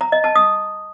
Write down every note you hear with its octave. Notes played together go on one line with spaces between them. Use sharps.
A#5
D#5
A5
D#6